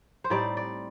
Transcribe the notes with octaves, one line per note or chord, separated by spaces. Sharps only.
C5
A2 G3 C4 D#4 D5
D5